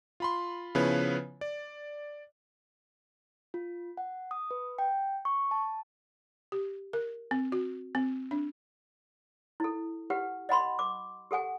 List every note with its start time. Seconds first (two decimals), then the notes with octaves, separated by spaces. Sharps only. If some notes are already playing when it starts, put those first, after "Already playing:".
0.20 F4 B5 C6
0.75 C#3 F3 B3 E4 B4 C#5
1.41 D5
3.54 F4
3.97 F#5
4.31 D#6
4.51 B4
4.79 G5
5.25 C#6
5.51 A5
6.52 G4
6.93 A#4
7.31 C4
7.52 F#4
7.95 C4
8.31 D4
9.60 E4 A4
10.10 G4 B4 F#5
10.49 D#5 F#5 B5 C6
10.79 D6
11.31 G4 A4 F#5 G#5